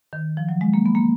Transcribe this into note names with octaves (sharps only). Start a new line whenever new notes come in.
D#3
F3
F#3
G#3
A#3
B3
A#3